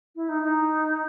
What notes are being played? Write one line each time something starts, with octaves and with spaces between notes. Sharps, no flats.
E4
D#4
D#4